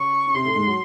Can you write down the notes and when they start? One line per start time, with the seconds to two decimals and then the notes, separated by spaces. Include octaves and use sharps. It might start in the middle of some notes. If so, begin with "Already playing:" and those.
Already playing: C#3 C#6
0.26 C#4
0.34 C3 C4 C6
0.45 A2 A3
0.55 G#2 G#3
0.67 F#3